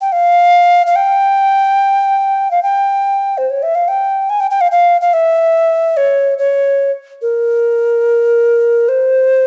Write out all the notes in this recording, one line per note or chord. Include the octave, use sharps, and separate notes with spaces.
G5
F5
F5
G5
F5
G5
C5
C#5
E5
F5
G5
G#5
G5
G5
F5
F5
F5
E5
C#5
C#5
A#4
C5